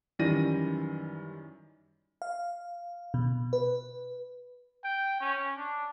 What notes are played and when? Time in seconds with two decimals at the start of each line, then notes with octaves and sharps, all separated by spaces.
0.19 F#2 D#3 E3 G3 A#6 D#7
2.22 F5
3.14 B2
3.53 B4
4.84 G5
5.20 C#4
5.57 D4